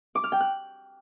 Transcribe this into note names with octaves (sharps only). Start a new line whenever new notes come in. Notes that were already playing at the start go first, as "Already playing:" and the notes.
D6
F6
G5
F#6